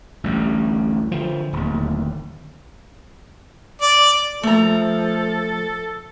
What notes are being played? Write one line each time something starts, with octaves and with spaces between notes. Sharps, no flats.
A1 D2 G3
D3 F3
D1 D#2
D5
F3 A3 A4 A#5